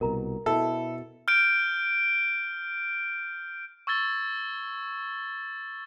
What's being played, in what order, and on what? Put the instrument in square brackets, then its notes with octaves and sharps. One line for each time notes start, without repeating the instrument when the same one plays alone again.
[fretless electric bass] C2 B2 [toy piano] A#4 A#5
[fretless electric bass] B2 [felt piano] E4 [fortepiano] A4
[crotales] F6 G6 D7
C#6 E6 G#6 A6 G7